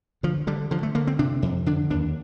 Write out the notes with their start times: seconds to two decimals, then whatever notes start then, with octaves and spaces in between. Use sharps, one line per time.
0.23 D3 F3
0.47 D3 G3
0.71 D3 F3
0.83 A3
0.95 D3 A#3
1.07 C4
1.19 C3 D4
1.42 F2
1.66 D3 D4
1.90 D#2 D4